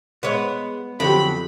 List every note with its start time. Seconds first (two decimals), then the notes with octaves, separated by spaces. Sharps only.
0.23 G#3 B3 C#5
1.00 F2 D3 F#3 G4 B5